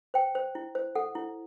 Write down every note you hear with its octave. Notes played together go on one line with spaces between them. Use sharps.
C5 G5
C5
E4
C5
A4 F#5
E4